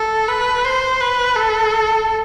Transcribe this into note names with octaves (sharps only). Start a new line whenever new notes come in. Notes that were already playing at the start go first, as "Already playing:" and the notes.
Already playing: A4
B4
C5
B4
A4